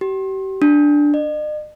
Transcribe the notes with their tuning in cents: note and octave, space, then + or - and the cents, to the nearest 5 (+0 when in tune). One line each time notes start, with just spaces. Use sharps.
G4 -35
D4 +0
D#5 -45